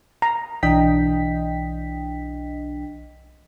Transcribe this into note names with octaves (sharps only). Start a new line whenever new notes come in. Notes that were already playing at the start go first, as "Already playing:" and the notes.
A#5
B1 E3 D4 D#5 G5 B6